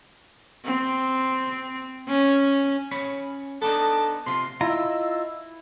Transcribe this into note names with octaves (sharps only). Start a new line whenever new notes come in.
C4
C#4
C#4 C#5 B5
B3 D4 D#4 A4
C3 F4 C6
E4 F4 D#5 A#5 E6